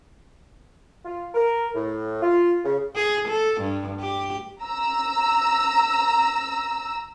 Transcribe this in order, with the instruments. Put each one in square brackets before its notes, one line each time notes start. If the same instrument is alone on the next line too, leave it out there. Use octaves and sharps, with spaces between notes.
[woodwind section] F4
A#4
A2
F4
C#3
[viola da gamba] G#4
A4
G2
G4
[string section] A#5 E6